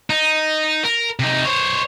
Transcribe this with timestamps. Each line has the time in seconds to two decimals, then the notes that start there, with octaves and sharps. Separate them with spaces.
0.10 D#4
0.84 A#4
1.19 C3 D#4
1.45 C5 C#5